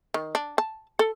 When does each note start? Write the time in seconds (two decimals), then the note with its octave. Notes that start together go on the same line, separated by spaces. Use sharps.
0.14 D#3
0.35 D4
0.58 A5
0.99 A4